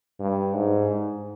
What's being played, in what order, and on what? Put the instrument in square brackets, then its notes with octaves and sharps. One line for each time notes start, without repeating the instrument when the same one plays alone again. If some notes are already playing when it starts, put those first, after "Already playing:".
[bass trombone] G2
G#2